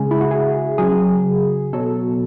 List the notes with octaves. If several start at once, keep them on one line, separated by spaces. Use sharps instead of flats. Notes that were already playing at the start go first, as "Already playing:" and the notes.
Already playing: C#3 G#3 G#4
E4
F#4
G#4
C#3 F#3 G#4
B2 F#3 A4